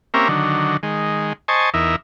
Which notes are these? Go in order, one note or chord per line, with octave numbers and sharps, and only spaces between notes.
A#3 C4 C#4 G4 A#4 E5
D3 D#3 F#3
D#3 G#3
C5 D#5 G#5 A5 C#6
E2 D#4 A#4 E5